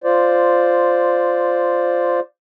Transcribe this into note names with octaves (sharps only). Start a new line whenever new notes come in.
F4 C5 D5